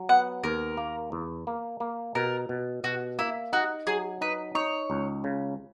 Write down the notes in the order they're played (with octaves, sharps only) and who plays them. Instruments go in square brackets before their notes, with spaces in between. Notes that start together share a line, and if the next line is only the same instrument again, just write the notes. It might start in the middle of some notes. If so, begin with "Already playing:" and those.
Already playing: [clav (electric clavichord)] F#3
[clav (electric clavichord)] B3 [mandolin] F#5
[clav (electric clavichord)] D#2 [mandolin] A#4
[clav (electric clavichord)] A#3
E2
A#3
A#3
[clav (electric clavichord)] B2 [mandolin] A#4
[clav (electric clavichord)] B2
[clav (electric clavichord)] B2 [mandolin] F#4
[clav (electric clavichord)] A#3 [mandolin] E4
[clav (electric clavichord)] D#4 [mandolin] F#4
[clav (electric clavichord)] F#3 [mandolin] G#4
[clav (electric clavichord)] D#4 [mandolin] B4
[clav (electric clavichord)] D#4 [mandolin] C#5
[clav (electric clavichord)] C#2
C#3